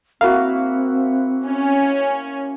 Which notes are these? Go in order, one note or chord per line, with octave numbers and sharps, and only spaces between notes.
A#3 C4 E4 F#4 F5
C#4